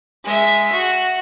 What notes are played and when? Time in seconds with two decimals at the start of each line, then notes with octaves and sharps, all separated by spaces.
0.24 G#3 E5
0.72 F#4